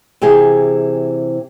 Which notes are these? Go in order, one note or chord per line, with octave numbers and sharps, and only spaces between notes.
C3 E3 G4 G#4